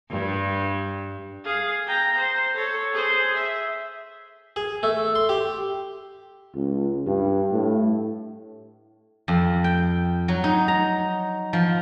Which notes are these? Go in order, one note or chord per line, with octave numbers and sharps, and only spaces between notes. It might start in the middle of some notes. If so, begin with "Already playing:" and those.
G2
G#4 F5
G5 A#5
C5
A4 C#5
G#4 C5
E5
G#4
A3
C6
G4
C#2
G2
A2
F2
G5
F#3
D#4
A#5
F3